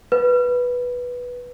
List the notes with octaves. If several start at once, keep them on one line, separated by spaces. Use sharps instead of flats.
B4